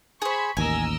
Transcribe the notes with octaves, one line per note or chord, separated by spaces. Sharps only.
G#4 C5 B5 C#6
A1 D#2 A#4 D#5 G#5 E6